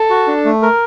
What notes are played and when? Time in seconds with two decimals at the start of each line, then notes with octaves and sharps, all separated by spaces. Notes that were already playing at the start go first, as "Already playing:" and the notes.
Already playing: A4
0.10 F#4
0.28 D4
0.45 A3
0.62 A#4